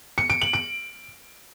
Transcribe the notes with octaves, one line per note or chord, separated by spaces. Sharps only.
C#7
D7
F#7
D7